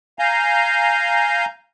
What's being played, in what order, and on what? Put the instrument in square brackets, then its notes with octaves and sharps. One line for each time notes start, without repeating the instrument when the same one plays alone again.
[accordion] F5 G#5 A#5 G6